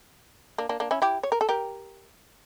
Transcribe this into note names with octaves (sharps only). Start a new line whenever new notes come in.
A#3 D4
A#3 D4
A#3 D4
C#4 E4
E4 G4
C#5
A#4
A4
G4 A#4